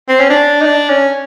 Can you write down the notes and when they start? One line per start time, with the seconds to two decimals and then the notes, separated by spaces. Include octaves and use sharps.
0.09 C4
0.20 C#4
0.30 D4
0.61 D#4
0.65 D4
0.89 C#4